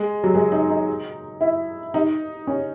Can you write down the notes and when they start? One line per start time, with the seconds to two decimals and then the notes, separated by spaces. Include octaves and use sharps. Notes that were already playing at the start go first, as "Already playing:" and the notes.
Already playing: G#3
0.24 F#3
0.35 G#3
0.52 D#4
0.70 D#4
1.41 E4
1.94 D#4
2.47 C#4